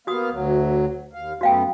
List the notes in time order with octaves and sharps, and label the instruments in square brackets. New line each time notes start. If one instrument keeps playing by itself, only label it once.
[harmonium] A#3 B3 F5 [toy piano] F#4 D#6
[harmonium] D2 F#3
D#2 F5
[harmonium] F#2 A3 B3 [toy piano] F#4 F5 G5